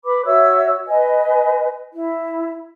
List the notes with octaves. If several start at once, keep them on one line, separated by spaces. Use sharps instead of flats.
B4 B5 D6
F#4 C#5 E5 E6
B4 D#5 G#5
E4